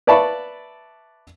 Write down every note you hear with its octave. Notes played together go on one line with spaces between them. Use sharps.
B4 D5 E5 A5 B5 C#6